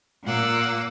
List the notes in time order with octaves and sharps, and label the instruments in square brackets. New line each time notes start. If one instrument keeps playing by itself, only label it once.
[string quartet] A#2 A#3 F#5 D6 E6